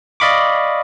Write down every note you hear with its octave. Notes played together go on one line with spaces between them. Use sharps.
D5 D#5 F5 B5 C#6 D6